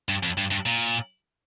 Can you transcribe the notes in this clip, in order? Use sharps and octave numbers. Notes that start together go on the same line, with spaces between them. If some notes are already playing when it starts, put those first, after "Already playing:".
G2
F2
G2
G2
A#2